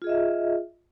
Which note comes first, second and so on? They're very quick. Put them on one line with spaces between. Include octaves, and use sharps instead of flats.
F4 G#4 D#5 E5